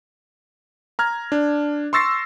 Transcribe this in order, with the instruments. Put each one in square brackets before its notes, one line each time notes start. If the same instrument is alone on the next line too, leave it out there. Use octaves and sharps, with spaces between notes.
[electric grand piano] A#5 F6 G#6
D4
C6 C#6 E6 A6 A#6 C7